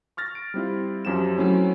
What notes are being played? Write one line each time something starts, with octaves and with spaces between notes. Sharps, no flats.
C#6 F6 A6 A#6
D7
G3 C4 E4 F4
F#2 F3 G4 E7
F#3 A3 C4 C#4 E4